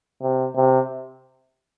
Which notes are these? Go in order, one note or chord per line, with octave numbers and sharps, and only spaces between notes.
C3
C3